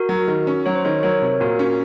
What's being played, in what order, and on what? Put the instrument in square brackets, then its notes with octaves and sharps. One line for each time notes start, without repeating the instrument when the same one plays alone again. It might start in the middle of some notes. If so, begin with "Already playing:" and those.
Already playing: [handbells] F#4 A#4
[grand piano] F#3
D#3
C#4
[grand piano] F#3 [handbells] C#5
[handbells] C5
[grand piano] D#3 [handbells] A#4 C#5
[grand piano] F#3 [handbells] A#4 C#5
[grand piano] C3
[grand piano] A#2 [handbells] F#4 A#4
[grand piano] C#4